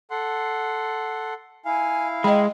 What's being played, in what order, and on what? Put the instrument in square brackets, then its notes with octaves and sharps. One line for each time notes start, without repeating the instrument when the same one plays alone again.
[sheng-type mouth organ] A4 F#5 C6
[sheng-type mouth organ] E4 F5 [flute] G#5
[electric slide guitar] G#3 [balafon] D#5 B5 [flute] G5